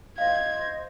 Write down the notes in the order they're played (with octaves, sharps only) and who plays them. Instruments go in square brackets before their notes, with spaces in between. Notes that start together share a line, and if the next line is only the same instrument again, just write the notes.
[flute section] C5 D#5 [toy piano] F5 [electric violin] G#6